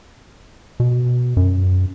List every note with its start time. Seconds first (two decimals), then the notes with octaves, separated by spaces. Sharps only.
0.80 B2
1.37 F#2